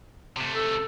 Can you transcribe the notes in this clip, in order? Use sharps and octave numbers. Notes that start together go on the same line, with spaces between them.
C3 A3
A4